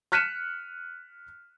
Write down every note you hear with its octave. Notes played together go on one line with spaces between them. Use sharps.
F6 F#6 B6 C#7 D#7 E7